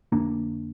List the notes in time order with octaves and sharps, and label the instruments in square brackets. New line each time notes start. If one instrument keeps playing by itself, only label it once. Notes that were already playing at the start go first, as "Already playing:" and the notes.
[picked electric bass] F2 D3 A#3 D4